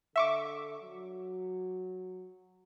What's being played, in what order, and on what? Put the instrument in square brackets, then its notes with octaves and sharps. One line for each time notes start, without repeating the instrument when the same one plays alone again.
[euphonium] D3 [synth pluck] E5 C#6 D6
[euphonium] F#3